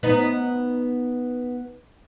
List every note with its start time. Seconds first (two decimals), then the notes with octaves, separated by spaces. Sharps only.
0.03 B3 D#4 B4